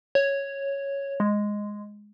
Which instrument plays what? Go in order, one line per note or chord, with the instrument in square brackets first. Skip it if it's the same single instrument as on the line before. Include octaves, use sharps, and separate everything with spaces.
[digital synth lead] C#5
G#3